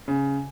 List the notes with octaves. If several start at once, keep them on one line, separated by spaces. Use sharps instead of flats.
C#3